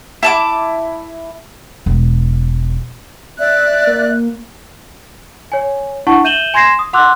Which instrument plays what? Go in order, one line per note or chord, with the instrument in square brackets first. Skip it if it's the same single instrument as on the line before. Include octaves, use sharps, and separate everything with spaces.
[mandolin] E4 A5 D6
[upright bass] E1
[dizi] D5 [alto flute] E5 [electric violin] F#6
[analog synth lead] A#3
[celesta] C#5 G#5
D4 E4 F#5 A5 C#6
E5 G6 D#7 E7 F#7 G7
G#5 C6 G#6 A#6 C7 E7
D#6
F#5 C6 D6 E6 F#6